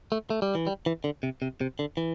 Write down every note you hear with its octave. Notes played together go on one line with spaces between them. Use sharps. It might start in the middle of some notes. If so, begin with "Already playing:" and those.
A3
A3
G3
E3
G3
E3
D3
C3
C3
C3
D3
E3